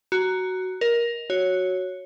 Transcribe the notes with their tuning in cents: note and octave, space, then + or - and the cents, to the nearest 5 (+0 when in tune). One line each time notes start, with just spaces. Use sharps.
F#4 +10 A#5 +0
A#4 +15 D#5 +10
F#4 +0 C#5 +0